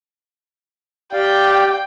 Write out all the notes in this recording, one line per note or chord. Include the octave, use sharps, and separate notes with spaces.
G4 D5 F5 G5